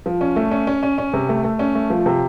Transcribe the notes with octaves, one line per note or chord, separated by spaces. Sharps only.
F3
C#4
A3
C#4
C#4
C#4
C#4
C3
A3
A3
C#4
A3
F3
C3